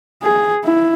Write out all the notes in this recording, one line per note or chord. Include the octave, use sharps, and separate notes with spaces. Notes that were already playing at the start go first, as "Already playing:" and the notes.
G#4
E4